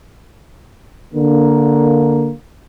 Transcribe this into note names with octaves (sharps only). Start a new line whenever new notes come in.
D3 A#3